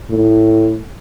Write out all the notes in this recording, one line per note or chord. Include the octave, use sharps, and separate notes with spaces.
A2